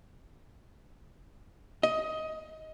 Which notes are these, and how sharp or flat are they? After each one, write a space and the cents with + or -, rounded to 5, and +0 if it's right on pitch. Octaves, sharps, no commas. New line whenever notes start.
D#5 +15